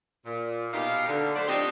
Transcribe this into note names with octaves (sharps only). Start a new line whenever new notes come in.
A#2
B2 D#4 G4 F5
D3
F#3 A3 D4 C5 D5
F3 C4 D4 D#4 G4 C5